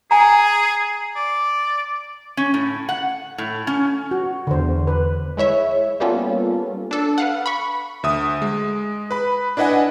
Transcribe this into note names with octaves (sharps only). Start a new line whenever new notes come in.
G#4 G#5 A#5
D5
C#4
A2
F#5
A2
C#4
F#4
E2 D3 C5
B4
G#3 E4 C#5 E5
G3 A#3 B3 C#4 F4 A4
D4 A4
B4 F5 F#5
B5 C#6
D2 E5 D#6
G#3
B4 B5
D4 E4 B4 D#5 F#5 G#5